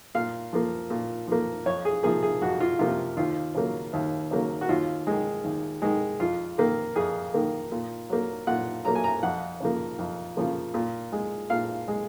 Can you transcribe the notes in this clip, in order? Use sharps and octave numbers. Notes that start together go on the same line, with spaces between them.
A#2 F5
F3 A#3
A#2
F3 A#3
F2 C#5
G#4
C3 F3 A#3 G#4
G#4
F2 F#4
F4
C3 F3 A#3 F4
D#2 F4
C#3 F#3 A#3
D#2
C#3 F#3 A#3
F#4
D#2 F4
D#3 G#3
D#2
D#3 G#3
F2 F4
D#3 A#3
F2 G#4
D#3 A#3
A#2
F#3 A#3
A#2 F#5
F#3 A#3 A#5
G#5
A#5
F2 F#5
C#3 F3 A#3
F2
C#3 F3 A#3
A#2
G#3
A#2 F5
G#3